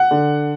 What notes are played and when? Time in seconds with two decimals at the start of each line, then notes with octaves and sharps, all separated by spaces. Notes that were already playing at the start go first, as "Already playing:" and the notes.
Already playing: F#5
0.11 D3